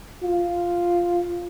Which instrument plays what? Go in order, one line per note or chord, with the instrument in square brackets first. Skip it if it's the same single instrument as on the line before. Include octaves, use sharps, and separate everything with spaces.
[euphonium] F4